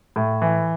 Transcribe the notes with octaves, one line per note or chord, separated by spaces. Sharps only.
A2
E3